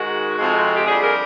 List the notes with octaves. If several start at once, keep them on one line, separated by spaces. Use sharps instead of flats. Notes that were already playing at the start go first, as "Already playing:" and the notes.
Already playing: G#2 D#3 G#3 F#4
F2 C3 F3 G#3
G4
F2 D3 G3 G#4
A#4